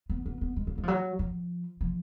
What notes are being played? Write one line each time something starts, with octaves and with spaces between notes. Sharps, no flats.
B3
B3
B3
G#3
A#3
G#3
F3
F#3
F3
F3